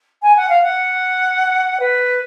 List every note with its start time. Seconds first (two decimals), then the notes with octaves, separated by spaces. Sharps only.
0.22 G#5
0.36 F#5
0.49 F5
0.62 F#5
1.80 B4